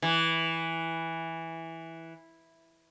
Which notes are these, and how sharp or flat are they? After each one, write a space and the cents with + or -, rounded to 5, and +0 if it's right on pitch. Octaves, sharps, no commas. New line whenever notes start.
E3 -5